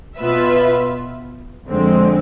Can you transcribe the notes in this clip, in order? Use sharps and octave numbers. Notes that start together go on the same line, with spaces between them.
B2 B3 F4 B4 E5
F2 D3 G#3 C4